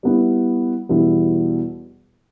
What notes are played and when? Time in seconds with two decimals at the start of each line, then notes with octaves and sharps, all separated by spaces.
0.03 G3 B3 E4
0.89 E2 B2 G3 B3 E4